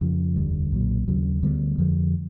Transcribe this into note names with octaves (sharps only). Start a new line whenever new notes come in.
F2 C#3 F3
F1 D#2 D3 G3
B1 A#2 F#3
D#2 C#3 F#3
D2 D3 G3 B3
F2 D3 F3